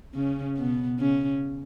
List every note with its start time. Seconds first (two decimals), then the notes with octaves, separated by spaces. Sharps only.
0.14 C#3 C#4
0.57 B2 B3
1.00 C#3 C#4